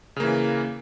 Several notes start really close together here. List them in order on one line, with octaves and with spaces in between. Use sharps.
C#3 A#3 E3